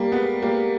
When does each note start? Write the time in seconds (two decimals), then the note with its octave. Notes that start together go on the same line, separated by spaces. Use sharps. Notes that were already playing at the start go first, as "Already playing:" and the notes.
Already playing: G3 A#3
0.12 G#3 B3
0.42 G3 A#3